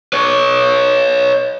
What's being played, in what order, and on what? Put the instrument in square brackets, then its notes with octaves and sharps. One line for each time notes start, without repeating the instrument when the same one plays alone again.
[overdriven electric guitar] B4 C#5